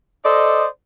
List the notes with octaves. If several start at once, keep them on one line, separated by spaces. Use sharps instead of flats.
A4 C5 D5 D#5